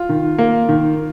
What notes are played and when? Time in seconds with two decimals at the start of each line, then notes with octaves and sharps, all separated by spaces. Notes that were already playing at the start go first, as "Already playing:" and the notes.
Already playing: F4
0.09 D#3
0.38 A#3
0.69 D#3